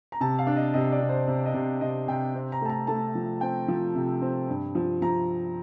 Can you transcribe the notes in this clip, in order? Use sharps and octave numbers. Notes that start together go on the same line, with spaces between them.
A#5
C3 A5
F5
D4
D#5
C3 D#5
D5
C3
C5
C3
D#5
C3
C3 D#5
C3 G5
C4
A#5
A3 A5
A#5
A3 A5
F3
C4 G5
F3
C3
C4
G2
F3
F3 A#5